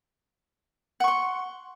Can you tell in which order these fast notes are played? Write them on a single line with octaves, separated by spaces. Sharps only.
F#5 C#6 C6